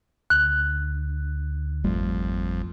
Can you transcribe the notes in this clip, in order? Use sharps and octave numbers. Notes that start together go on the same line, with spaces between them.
D2 F#6
G#1 F2 G3 A3